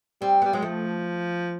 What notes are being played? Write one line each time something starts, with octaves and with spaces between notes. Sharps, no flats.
G3 C4
G3 B3
F#3 G#3
F3 A3